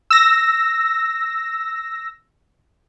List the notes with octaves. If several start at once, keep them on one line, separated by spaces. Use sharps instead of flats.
E6 A#6